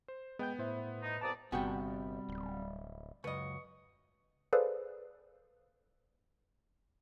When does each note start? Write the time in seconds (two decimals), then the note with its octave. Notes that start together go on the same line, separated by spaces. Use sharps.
0.08 C5
0.39 G#3 B3 G5 G6
0.59 A2 C5 E5
1.02 D#4
1.21 C2 D5 A5 A#5 D#6
1.52 G1 C3 G3 B3 F#4 G#4 G5
2.29 D1
3.24 C#2 F#2 B4 D#5 C#6
4.53 G#4 A4 B4 C5 D5 F5